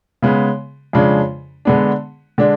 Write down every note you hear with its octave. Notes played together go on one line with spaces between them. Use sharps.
C#3 G#3 B3
F2 C#3 G#3 D4
D3 G#3 B3 D4
D3 G#3 D4